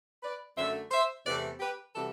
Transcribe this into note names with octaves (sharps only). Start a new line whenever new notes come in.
B4 D5
F#2 D3 A3 C5 E5
C5 E5
E2 C3 E3 A3 B4 D5
G4 B4
C3 E3 G3 F#4 A4